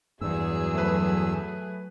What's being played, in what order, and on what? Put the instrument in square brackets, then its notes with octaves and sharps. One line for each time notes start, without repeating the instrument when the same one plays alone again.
[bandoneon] E2 E6 [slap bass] G2 [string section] F#3 G#4
[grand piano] A3 B4